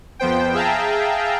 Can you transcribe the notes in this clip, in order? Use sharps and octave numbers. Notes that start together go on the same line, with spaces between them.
F2 F3 B3 C5 G5
G#4 E5 F5 G5 A5 A#5